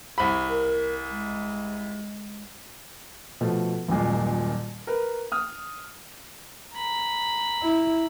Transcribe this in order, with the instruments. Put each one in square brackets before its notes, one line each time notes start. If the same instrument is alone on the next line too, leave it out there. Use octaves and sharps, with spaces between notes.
[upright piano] C2 B5
[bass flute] A#4
G#3
[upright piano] B2 F3 A3
D#1 F#2 A#2 G#3
A#4 B4
D#6 F6
[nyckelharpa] A#5 B5
[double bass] E4